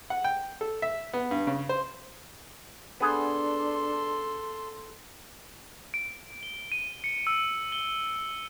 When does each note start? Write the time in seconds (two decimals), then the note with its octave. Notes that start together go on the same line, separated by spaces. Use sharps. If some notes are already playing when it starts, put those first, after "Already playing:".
0.10 F#5
0.24 G5
0.61 A4
0.82 E5
1.13 B3
1.31 G2
1.47 C#3
1.69 C5
3.00 B3 D4 G#4 A4 C6
5.94 D7
6.43 G7
6.72 D#7
7.04 C#7
7.27 E6
7.72 G7
7.87 G7